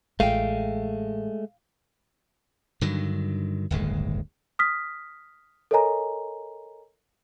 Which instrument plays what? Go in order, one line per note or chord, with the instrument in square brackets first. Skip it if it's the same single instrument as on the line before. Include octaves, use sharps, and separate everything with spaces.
[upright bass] A1 F4 [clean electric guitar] G#3 A3 [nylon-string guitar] F5 G5
[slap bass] G2 D3 D#3 F#3
D1 G1 D#2 G#3
[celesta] D#6 F6 B6
A4 A#4 C#5 D#5 G#5 A#5